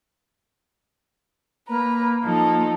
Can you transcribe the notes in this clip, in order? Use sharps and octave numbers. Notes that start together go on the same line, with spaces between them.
A#3 B4 A#5
F3 D#4 A4